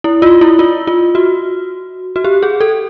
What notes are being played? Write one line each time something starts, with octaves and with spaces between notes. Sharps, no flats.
E4
F4
E4
F4
F4
F#4
F#4
G4
G#4
A4